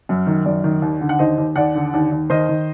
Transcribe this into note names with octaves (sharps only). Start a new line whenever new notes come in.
F#2
D#3
F#2 D5
D#3
D#2
D3
F#5
D#2 C5 D#5
D#2
D#2 D5 F#5
D3
D#2
D#2
D#3 C5 D#5
D#3